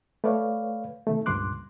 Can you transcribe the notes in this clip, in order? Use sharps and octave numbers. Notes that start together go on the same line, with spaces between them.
A3 B4 C#5 D5 F5
C3 D#3 A3
C#2 G2 A#2 C6 D6 F#6